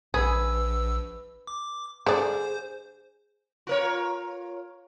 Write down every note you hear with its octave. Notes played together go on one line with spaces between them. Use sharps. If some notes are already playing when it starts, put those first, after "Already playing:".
A#1 G#4 B4 E6
D6
D3 G#4 C5 D5
F4 A#4 C#5